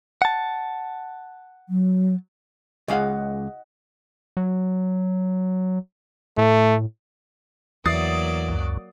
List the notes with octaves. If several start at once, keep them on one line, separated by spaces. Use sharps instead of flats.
F#5 A5
F#3
C#2 G#3 D#5 F5 F#5
F#3
A2 A3
E2 F#3 A#3 D5 D#6 A6 C7
C#2 F#2